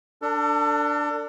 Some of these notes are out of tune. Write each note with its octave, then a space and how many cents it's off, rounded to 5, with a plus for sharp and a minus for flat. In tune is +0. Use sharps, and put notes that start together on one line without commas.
D4 +0 A4 +35